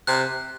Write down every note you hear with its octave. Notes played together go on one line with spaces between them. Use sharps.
C3 F#6